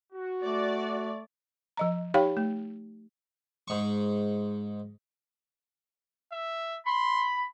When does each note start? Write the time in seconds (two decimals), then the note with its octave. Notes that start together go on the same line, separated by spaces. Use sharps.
0.13 F#4
0.44 A3 D5
1.77 F3 D#5 A#5
2.14 D#4 G4 C#5 F5 G5 B5
2.37 A3
3.68 G#2 C#6
6.32 E5
6.87 B5 C6